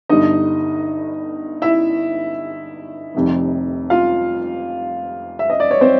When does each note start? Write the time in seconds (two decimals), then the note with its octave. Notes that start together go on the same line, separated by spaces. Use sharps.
0.09 G1 G2 D3 D#4 D#5
1.62 E4 E5
3.14 F1 F2 C3 D#3
3.90 F4 F5
5.39 E5
5.50 D#5
5.60 D5
5.71 C#5
5.81 C4 C5